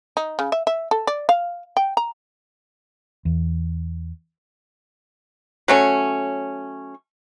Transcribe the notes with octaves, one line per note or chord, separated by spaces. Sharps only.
D#4
C#3
E5
E5
A4
D5
F5
G5
A#5
E2
F#3 A3 C#4